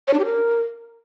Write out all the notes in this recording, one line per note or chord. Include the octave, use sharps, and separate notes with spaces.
C#5
D4
G4
A#4